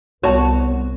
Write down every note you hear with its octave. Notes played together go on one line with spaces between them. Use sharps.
C2 B3 F#4 C#5 A5